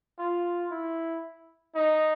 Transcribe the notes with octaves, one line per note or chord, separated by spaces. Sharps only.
F4
E4
D#4